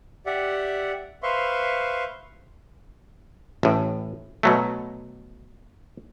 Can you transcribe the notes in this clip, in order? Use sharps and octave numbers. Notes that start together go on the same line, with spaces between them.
G4 D5 E5 F#5
B4 C5 E5 F5 C6 C#6
A1 A2
B2 F#3 A3